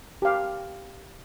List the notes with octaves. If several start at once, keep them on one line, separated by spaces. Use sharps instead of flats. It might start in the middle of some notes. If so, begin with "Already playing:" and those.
G4 F5